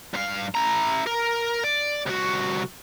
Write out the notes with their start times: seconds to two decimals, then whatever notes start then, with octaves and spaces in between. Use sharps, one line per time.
0.14 G2 F5
0.55 E4 A#5
1.06 A#4
1.64 D5
2.06 C2 F#4